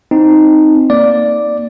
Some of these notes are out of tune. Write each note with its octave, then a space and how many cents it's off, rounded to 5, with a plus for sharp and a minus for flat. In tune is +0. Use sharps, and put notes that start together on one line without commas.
C4 +0 D#4 +0
A#3 +0 D5 +0